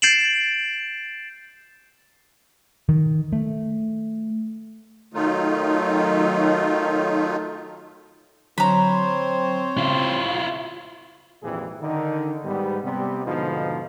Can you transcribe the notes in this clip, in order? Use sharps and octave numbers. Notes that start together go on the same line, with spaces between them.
G6 A6 C7 D7 E7 F#7
D#3
A3
D#3 F#3 A3 D#4 F4
D3 F#3 C4 C5 C#5 A#5 B5
C#3 E4 F4
G#1 F2 A#2 E3 G3 G#4
D3 D#3 D#4
G#2 G3 B3
C3 G3 B3
G#2 B2 D3 F3 D#4 F4